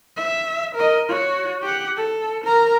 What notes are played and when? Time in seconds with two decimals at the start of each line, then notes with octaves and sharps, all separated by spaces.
0.17 E5
0.75 A#4 D#5
1.09 F#4 C#5
1.62 G4 F#5
1.97 A4
2.44 A#4 A#5